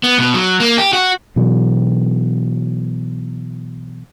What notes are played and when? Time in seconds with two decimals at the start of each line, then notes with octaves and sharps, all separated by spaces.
0.04 B3
0.19 B2
0.34 F#3
0.60 A#3
0.78 G4
0.93 F#4
1.36 B2 E3 F#3